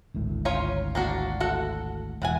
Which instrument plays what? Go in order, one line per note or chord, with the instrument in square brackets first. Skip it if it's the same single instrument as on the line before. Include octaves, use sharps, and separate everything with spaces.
[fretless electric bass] G#1 D2 A2
[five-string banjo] C#4 F4 C#5
A#3 D4 F#4
F#4 A4 F#5
[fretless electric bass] E1 [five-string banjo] E3 F#5 G#5